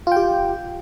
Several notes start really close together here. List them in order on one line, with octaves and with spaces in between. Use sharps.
F4 G5 G4